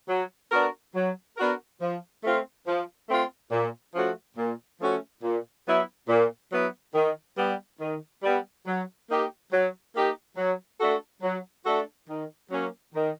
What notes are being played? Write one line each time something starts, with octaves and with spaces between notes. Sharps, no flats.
F#3
B3 D4 F#4 A#4
F#3
B3 D4 F#4 A#4
F3
A3 C4 F4
F3
A3 C4 F4
A#2
F3 A3 C#4 F#4
A#2
F3 A3 C#4 F#4
A#2
F#3 B3 E4
A#2
F#3 B3 E4
D#3
G3 B3
D#3
G3 B3
F#3
A#3 D#4 G4
F#3
A#3 D#4 G4
F#3
A3 D4 F#4 A4
F#3
A3 D4 F#4 A4
D#3
F#3 A#3 C#4
D#3